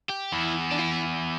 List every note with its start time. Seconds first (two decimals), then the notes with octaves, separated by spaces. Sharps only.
0.09 G4
0.32 E2 E4
0.71 D4
0.79 E4